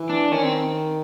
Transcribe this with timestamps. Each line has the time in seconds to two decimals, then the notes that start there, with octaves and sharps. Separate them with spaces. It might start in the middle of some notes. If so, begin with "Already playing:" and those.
Already playing: E3
0.09 D4
0.31 D#3 C#4
0.42 C4